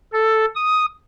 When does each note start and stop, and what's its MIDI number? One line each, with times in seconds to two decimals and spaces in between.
0.12 0.45 69
0.55 0.86 87